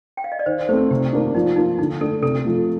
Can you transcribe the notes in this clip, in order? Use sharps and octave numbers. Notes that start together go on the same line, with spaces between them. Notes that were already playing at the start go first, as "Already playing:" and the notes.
G5
F5
D#5
D5
D#3 C5
A3 C4 C5
C3 G4
D#3 A#3 D4
F3 D#4
A#3 D#4 F4
D3 D#4
A3 D4 A4
C3 A4
F3 A3